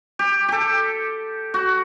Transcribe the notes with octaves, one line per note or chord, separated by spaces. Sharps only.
G4
G4 A4
F#4